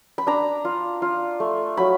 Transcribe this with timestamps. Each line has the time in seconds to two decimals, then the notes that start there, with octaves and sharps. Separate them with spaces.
0.18 B5
0.27 D4 A#5
0.65 F4
1.02 F4
1.40 A3
1.77 F#3 B5